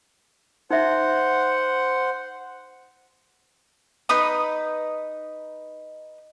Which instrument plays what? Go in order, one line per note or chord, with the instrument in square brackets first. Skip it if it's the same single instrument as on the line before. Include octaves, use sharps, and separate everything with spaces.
[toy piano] D#4 E5 [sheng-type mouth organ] C5 F#5
[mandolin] D#4 B4 D#6